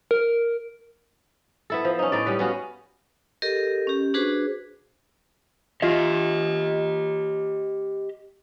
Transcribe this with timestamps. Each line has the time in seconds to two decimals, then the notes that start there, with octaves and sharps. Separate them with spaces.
0.11 A#4
1.70 B3 E4 A4
1.85 F3
1.99 C#4 D#4
2.12 A2 D#4 D5
2.26 G3 B3 C#4 B4
2.39 B3 C#4 F#4 F5
3.42 G4 A4 A#4 D#5
3.87 C#4 G4
4.14 D4 F#4 G#4 B4 C5
5.82 F4 G4 D#5 E5